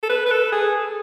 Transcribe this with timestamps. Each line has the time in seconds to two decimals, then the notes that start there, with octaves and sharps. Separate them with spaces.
0.03 A4
0.09 B4
0.26 B4
0.31 A4
0.52 G#4